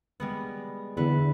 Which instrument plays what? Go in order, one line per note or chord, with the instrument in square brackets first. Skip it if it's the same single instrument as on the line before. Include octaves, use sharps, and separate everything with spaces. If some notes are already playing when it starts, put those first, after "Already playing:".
[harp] G3 G#3 B3
[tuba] E2 [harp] D3 B4